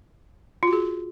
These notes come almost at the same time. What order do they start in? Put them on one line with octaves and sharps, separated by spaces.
F4 F#4 G#4